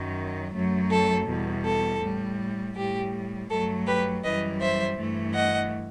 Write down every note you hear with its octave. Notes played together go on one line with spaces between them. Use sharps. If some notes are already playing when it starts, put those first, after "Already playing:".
Already playing: F#2 D#3 F#3
F#2 F#3 A3
A4
E2 B2 G3
A4
A2 G3
A2 G3 G4
G2 F#3 A3 A4
G4 B4
F#2 E3 G3 B4 D#5
C5 E5
G2 E3 A3
D#5 F#5